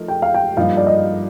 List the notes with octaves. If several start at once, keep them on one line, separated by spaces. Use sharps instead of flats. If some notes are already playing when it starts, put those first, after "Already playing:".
Already playing: F3 A3 D#4 A#4
G5
F5
G5
G2 F3 A#3 D#4 F5
D5
D#5